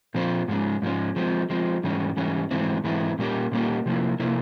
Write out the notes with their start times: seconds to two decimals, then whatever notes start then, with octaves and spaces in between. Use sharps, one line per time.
0.14 A#2 F3 C4 F4 C5
0.48 G#2 F3 G#3 C#4
0.82 G#2 F3 G#3 C#4
1.16 F3 G#3 C4
1.50 F3 G#3 C4
1.84 G#2 E3 G3 C#4
2.17 G#2 E3 G3 C#4
2.51 G#2 E3 G#3 C4 E4
2.84 G#2 E3 G#3 C4 E4
3.19 A#2 G3 A#3 C#4 G4
3.52 A#2 G3 A#3 C#4 G4
3.86 C3 F3 A#3 E4
4.20 C3 F3 A#3 E4